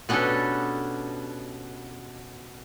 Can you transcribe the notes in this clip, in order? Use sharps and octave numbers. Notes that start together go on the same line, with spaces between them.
B2 B3 C#4 D4 G4 A4